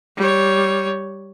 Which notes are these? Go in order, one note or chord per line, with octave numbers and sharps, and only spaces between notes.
G3 C#5